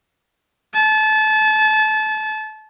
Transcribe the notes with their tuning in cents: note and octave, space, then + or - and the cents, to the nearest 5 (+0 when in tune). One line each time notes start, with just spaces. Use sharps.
A5 -30